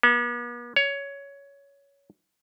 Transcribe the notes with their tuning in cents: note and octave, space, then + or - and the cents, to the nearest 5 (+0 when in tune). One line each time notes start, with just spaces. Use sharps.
B3 -45
C#5 +15